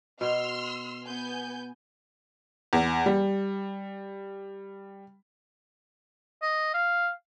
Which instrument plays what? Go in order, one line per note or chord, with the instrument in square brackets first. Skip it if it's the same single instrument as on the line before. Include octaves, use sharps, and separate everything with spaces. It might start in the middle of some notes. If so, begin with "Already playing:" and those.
[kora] B2 [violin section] C6 E6 F6
[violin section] B3 G#5 G6
[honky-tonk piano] E2
G3
[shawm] D#5
F5